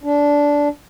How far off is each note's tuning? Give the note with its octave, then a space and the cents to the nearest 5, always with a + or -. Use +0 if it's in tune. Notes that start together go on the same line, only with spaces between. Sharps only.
D4 -15